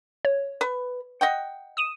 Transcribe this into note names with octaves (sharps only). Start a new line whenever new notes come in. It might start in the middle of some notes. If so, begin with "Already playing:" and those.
C#5
B4
D#5 F#5 G5
D#6 D#7 E7